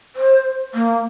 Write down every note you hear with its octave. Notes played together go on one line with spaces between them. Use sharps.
C5
A#3